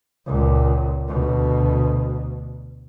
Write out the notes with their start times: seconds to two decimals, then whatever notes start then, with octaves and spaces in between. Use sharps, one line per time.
0.26 C#2 A#2
1.08 D2 B2